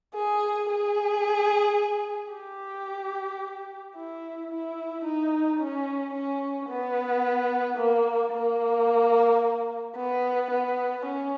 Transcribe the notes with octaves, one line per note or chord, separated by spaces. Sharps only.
G#4
G#4
G4
E4
E4
D#4
C#4
C#4
B3
A#3
A#3
B3
B3
C#4